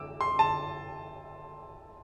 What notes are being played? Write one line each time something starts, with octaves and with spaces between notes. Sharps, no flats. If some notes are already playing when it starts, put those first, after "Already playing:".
Already playing: D6 E6
C6
A5